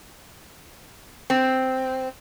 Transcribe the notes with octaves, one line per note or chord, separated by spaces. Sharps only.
C4